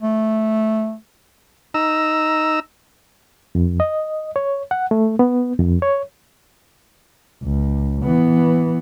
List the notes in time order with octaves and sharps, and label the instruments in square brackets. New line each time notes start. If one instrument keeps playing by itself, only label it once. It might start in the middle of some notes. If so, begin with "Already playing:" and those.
[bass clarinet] A3
[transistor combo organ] D#4 A#5 E6
[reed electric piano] F2
D#5
C#5
F#5
A3
B3
F2
C#5
[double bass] C#2
E3 B3